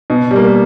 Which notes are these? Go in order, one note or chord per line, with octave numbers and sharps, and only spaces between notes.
B2
G3
A#3